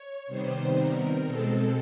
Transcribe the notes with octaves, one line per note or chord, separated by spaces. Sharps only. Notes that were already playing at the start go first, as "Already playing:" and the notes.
Already playing: C#5
C3 D#3 G3 B3 C5
A#4
B2 G#3 C4 A4